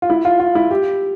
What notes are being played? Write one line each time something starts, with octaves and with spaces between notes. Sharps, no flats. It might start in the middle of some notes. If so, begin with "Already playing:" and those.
F4
E4
F4
F4
E4
G4